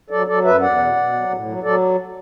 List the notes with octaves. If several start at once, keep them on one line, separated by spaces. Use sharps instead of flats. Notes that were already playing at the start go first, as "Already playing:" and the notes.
F#3 A4 D5
F#3 A4 D5
F#2 B4 E5
E2 D5 F#5
B2
B2
F#3
A2
F#3
F#3 A4 D5